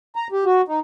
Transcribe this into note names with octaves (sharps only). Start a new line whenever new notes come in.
A#5
G4
F#4
D#4